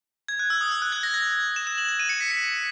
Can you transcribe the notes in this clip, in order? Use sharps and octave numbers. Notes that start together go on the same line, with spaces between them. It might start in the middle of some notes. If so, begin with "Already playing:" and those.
G#6
F#6
E6
D#6
E6
F#6
G#6
A#6
G#6
E7
E7
F#7
E7
D#7
C#7
B6
C#7